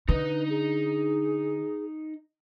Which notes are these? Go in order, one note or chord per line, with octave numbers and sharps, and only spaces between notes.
D3 D#4 B4 D#5
G#4